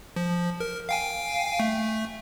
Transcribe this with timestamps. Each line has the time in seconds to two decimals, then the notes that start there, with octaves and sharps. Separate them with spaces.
0.16 F3
0.60 A#4
0.89 F5 G5 G#5
1.60 A3